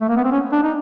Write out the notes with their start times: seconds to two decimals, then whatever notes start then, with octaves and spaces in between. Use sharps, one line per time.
0.01 A3
0.09 A#3
0.16 B3
0.24 C4
0.32 C#4
0.52 D4
0.63 D#4